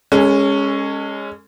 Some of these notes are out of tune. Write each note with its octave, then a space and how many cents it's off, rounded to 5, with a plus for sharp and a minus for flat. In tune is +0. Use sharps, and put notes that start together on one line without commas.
G#3 -15 C#4 +0 A4 +30